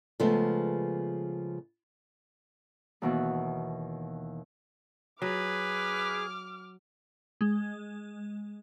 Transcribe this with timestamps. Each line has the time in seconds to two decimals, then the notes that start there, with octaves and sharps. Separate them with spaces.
0.20 C#3 F3 G#3 A3 B3
3.02 D#2 B2 E3
5.22 F#3 G#4 B4 D6 F6
7.41 G#3